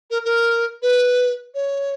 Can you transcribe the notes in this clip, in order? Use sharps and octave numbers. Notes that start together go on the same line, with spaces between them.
A#4
A#4
B4
C#5